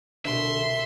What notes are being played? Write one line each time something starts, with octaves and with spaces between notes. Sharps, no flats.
C2 B2 D3 E5 C6